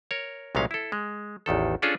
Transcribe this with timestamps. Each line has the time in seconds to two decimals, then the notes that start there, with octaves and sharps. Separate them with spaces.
0.11 A#4 C#5
0.55 C2 A#2 F#3 G#3 C#4 F5
0.71 E4 A4
0.92 G#3
1.46 A1 E2 D#3 A4
1.82 C#4 D4 F4 G#4 A4